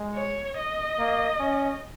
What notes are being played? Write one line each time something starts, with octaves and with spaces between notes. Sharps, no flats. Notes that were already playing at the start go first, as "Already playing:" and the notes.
Already playing: G#3
C#5
D#5
A#3
C#4